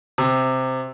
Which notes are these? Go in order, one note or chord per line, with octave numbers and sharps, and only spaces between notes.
C3